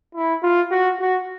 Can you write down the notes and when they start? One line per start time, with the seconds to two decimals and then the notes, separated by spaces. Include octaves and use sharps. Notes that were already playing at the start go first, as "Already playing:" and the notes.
0.15 E4
0.43 F4
0.71 F#4
1.00 F#4